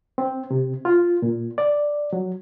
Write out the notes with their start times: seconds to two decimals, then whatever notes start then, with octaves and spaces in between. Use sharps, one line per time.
0.18 C4
0.51 C3
0.85 F4
1.22 A#2
1.58 D5
2.13 F#3